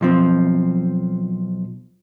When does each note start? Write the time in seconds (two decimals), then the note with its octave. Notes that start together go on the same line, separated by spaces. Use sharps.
0.01 B1 F3 C4